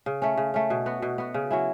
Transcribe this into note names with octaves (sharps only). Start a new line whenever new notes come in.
C#3
A3 C#4
C#3
A3 C#4
B2
B3 F#4
B2
B3 F#4
C#3
F#3 C#4 E4